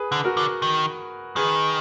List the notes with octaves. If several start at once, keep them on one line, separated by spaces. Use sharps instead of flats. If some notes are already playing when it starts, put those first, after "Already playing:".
Already playing: G#4 B4
D3
F#4 A#4
D3
D#3
D#3 G#4 B4